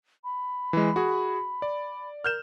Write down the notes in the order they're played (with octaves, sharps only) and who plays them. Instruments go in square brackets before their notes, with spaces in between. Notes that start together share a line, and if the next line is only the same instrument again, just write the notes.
[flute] B5
[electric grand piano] E3 G#3
F#4 G#4
D5
[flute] A#4 [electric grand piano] F6 G6 E7